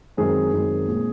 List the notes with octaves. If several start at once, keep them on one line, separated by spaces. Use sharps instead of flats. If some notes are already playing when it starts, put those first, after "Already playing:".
F#2 D#3 G#3 C4 G#4
F#2 D#3 G#3 C4
A#2 G#3 C4